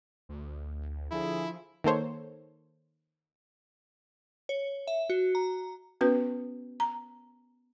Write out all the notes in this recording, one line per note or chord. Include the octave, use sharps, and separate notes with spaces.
D2
D3 F3 E4 G#4
D#3 A#3 A4 C5 C#5
C#5
E5
F#4
A#5
B3 C#4 F#4 B4
A#5